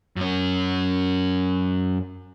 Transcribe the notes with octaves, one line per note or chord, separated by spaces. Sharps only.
F#2 C#4